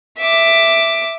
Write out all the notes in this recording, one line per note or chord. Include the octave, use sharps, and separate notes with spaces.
E5 D6